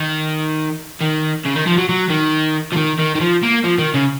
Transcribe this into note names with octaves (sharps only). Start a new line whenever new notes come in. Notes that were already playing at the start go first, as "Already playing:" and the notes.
Already playing: D#3
D#3
C#3
D#3
F3
F#3
F#3
D#3
F3
D#3
D#3
D#3
F3
A#3
F3
D#3
C#3